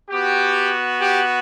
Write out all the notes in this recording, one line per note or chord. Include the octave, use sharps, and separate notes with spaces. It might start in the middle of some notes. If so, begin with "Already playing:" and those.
B3 F#4 G4
G4